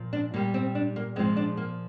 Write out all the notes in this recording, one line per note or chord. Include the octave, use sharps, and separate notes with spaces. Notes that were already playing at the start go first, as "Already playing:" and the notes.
Already playing: A#2 F3
D4
A#2 G3 A#3
C4
D4
A#3
A#2 F3 G#3 C4
D4
A#3